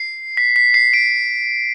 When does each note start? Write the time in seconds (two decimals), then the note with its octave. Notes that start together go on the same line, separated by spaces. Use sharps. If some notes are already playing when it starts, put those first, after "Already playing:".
Already playing: C7
0.37 B6
0.56 B6
0.74 C7
0.93 D7